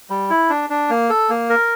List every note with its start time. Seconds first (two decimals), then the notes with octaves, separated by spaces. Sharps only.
0.10 G3
0.30 E4
0.50 D4
0.70 D4
0.89 A#3
1.10 A4
1.29 A#3
1.50 A#4